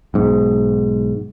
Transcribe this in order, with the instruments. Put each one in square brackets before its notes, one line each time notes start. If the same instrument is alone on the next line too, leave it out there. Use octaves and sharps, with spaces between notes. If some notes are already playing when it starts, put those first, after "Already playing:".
[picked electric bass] B1 G#2